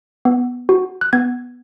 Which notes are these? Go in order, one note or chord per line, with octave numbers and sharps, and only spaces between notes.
B3
F#4
F#6
B3 G#6